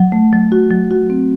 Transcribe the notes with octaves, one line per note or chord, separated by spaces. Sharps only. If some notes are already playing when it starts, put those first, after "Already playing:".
Already playing: F#3
A3
F#3
F#4
F#3
F#4
C4